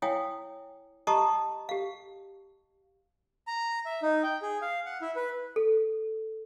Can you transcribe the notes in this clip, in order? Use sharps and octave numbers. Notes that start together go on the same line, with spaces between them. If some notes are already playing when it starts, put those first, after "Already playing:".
E4 C#5 F5 G5 G#5 D#6
G4 D#5 A5 A#5 C#6 D#6
G4 F5
A#5
E5
D#4
G5
G#4
F5
F#5
E4
B4
A4